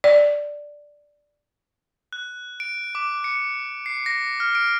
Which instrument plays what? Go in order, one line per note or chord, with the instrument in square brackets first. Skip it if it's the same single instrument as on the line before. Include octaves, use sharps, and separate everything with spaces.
[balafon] D5
[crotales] F#6
D7
D6
C#7
C7
A#6
F6
D7